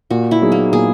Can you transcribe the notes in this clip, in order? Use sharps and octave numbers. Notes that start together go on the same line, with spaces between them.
A#2 F#4
E4
F#3 B3 D#4 G#4
A#3
A#2 G#4